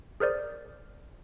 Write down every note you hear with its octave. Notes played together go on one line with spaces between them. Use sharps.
G#4 A#4 C5 D5